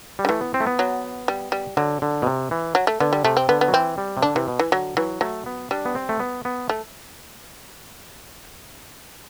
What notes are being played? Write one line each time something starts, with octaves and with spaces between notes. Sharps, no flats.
G3
D3
E3 A3
B3
C4
A3
B3
F#3
G3
G3
D3 F#3
D3
B2
C3
E3
F#3
A3
D3 B3
G3
C3 A3
C4
D3 B3
B3
F#3
E3 C4
G3
C3
D3 D4
C3 E3
B2
E3
D3 F#3
E3 F#3
F#3 A3
B3
G3 D4
B3
C4
A3
B3
B3
A3